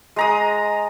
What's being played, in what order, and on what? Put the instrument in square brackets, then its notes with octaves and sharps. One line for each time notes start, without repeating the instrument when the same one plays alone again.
[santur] G#3 A#5 D#6